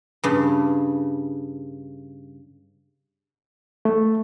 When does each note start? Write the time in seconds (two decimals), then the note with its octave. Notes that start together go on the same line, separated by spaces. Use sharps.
0.24 G2 C#3
3.85 A3